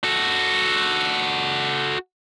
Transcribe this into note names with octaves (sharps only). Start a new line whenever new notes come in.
F#4 A4